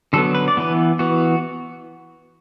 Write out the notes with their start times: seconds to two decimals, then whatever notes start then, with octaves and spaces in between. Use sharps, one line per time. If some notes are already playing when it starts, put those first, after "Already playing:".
0.13 D3 F#3 B3 A4
0.35 B4
0.48 D5
0.57 E3 B3 B4
0.99 E3 B3 F#4